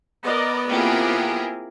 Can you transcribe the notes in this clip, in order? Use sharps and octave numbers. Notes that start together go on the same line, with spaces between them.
B3 A#4 D5 D#5
A#3 C4 E4 F4 G4 G#4 A#4